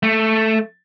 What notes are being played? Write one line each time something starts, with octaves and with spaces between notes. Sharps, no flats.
A3